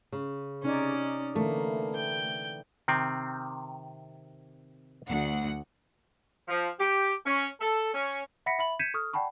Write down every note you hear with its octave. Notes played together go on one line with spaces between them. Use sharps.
C#3
C3 C#4 D#4 D5
D3 E3 A3 A#3
G5
C3 D#3 C4
D2 F#5
F3
G4
C#4
A4
C#4
E5 F#5 B5 A#6 B6 C#7
E5 B5 F#7
G6 G#6 B6 C#7 D#7 E7
A4 C#6 D#6 F6
D5 F#5 G5 A5 B5 C#6